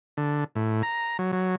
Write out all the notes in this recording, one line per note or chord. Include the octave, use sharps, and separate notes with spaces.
D3
A2
A#5
F#3
F#3